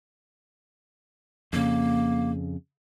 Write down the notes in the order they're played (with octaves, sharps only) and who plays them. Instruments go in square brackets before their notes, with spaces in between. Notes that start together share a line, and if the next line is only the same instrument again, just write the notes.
[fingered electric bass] F2 C#3 [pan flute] A#3